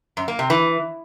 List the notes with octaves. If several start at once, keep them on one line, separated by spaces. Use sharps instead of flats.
F#2
A#3
C3
E3